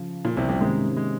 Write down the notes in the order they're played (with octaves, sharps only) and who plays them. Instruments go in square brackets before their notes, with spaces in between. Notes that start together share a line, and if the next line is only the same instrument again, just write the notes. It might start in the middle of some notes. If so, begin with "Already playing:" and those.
Already playing: [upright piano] C#3 F3
[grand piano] A#2
C2 C3
C2 C3
[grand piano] G#2 G#3 [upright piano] C3 D#3 A#3 C#4
[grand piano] G#3